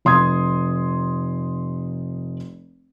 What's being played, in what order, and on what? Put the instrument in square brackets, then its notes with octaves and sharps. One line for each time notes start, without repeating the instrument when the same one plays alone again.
[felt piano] F1 C6 D#6 G#6